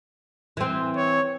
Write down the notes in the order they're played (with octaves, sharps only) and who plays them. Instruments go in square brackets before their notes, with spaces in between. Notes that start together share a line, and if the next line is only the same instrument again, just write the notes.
[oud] E3 C4
[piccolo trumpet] C#5